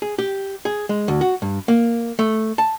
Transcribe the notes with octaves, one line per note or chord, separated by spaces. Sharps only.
G#4
G4
G#4
G#3
D2
F#4
G2
A#3
A3
A5